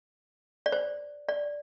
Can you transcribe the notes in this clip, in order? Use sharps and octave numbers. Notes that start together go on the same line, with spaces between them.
D5
C5
D5